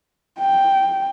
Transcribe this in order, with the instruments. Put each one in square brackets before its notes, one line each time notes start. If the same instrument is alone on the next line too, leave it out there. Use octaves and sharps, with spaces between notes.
[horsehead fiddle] G5